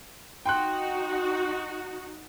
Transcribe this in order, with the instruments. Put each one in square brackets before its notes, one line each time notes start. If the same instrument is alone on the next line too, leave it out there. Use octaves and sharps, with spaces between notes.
[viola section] D#4 F#4 [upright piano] G5 C6 F#6